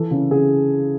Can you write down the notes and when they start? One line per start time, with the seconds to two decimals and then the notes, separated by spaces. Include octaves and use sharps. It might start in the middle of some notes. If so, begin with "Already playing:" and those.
Already playing: E3 A4
0.11 C#3
0.31 C#3 G#4